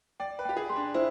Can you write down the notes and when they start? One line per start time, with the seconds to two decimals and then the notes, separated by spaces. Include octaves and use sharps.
0.20 D5 G5
0.39 B4
0.45 G4 G5
0.56 G#4
0.70 C6
0.76 D4
0.94 E4 C5